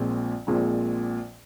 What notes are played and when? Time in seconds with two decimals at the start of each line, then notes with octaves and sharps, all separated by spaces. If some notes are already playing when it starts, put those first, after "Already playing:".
Already playing: A#1 A#2 F3 G#3 C4
0.47 A#1 A#2 F3 G#3 C4